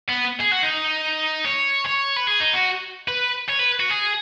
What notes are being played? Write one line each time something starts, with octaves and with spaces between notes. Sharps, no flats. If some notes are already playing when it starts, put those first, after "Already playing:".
B3
G#4
F#4
D#4
C#5
C#5
B4
G#4
D#4
F#4
B4
C#5
B4
F#4
G#4